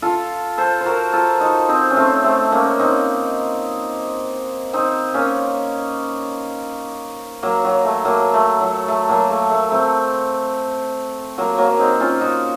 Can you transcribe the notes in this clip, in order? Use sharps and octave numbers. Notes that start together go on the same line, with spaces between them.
F4 A4
A4 C5
C5
F#4 A#4
F4 A4
D#4 F#4
C4 D#4
C#4
A3 C4
A3 C4
A#3 C#4
C4 D#4
C4 D#4
A#3 C#4
F#3 A#3
F#3
A3
F#3 A#3
A3
F#3
A3
F#3 A#3
A3
A3
A3 C4
F#3 A#3
F#3 A#3
C4 D#4
C#4 F4
D#4 F#4